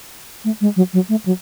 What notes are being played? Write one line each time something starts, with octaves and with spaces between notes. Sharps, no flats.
A3
G#3
F#3
F#3
A3
F#3